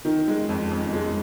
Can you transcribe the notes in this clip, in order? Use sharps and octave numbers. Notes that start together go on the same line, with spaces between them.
D#3
G#3
F2
F2
G#3